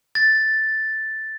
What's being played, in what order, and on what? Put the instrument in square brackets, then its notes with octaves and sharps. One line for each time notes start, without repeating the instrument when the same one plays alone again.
[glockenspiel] A6